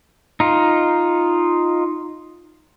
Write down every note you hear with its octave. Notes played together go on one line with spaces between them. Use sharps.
D#4 F4